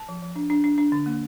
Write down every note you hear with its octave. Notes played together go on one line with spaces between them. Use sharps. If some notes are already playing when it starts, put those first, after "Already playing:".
Already playing: A5
F3
F3
D4
D4
D4
D4
D3
A#3